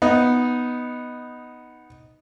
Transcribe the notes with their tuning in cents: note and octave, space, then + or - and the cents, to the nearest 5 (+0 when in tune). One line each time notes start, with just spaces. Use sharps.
B3 +0 D#4 +0